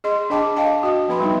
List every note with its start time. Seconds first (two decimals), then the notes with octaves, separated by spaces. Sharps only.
0.04 G#4 D#5 C6
0.30 D4 G#4 D#5 G5 A5 D6
0.56 D#5 F5 G5 A5
0.83 F#4 D#5
1.08 F3 B3 B4 B5 C6
1.20 G3 B3 D#4